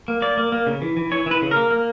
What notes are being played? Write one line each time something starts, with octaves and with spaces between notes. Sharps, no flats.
A#3
A#3 D5
A#3
A#3
C#3
E3
E3
E3 C#5
E3 B4
C#3
A#3 A#4
A#3